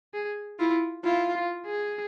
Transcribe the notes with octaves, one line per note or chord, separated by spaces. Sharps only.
G#4
E4 F4
E4 F4
F4
G#4